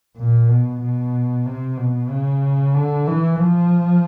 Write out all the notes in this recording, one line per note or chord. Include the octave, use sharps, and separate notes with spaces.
A#2
B2
B2
C3
B2
C#3
D3
E3
F3